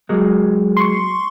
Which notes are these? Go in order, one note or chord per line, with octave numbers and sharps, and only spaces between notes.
F#3 G#3 A#3
C6 C#6